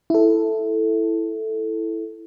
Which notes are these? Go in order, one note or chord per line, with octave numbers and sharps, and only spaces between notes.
E4 A4